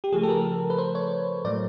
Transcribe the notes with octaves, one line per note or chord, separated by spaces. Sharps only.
G4
C#3 F3 A3 G#4
A4
A#4
B4
C5
C#5
A2 F#3 A3 D5